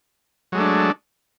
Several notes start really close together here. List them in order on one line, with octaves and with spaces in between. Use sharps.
F#3 G#3 A3 D4